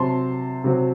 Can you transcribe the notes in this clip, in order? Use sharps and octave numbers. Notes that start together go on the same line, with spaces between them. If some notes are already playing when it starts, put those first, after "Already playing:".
Already playing: C3 F#3 C4 A5 C6
C3 F#3 C4